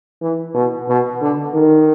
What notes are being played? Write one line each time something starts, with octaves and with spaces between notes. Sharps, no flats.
E3
B2
B2
D3
D#3